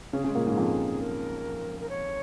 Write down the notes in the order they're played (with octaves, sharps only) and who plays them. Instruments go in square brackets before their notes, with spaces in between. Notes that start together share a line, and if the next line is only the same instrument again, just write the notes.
[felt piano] C#3 C#4 [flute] G#4
[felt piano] C#3 C#4
G#3
A#2 A#3
G#2 G#3
F2 F3
[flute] A#4
A#4
C#5